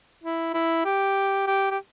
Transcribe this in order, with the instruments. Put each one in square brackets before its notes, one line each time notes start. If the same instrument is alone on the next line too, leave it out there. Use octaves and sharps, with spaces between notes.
[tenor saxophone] E4
E4
G4
G4
G4